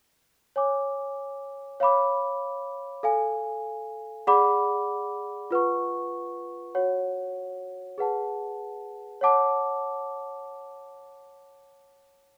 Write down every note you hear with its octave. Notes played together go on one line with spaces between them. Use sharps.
C#5 G#5 D6
C#5 F5 B5 D6
A4 F5 G#5
G#4 D5 F#5 B5 D6
F4 B4 F#5 C#6
F#4 C#5 F#5
G#4 B4 F#5 A5
C#5 F#5 A5 D6